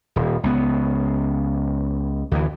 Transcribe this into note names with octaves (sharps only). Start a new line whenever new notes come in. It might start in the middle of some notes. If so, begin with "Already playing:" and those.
D#1
C#2 B3
D2 E3